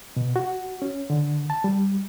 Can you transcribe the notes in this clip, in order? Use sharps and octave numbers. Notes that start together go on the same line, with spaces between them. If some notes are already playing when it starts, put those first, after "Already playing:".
B2
F#4
C#4
D3
A5
G3